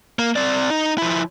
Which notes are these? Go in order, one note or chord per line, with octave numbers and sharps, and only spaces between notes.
A#3
C4 D5
D#4
F3 E4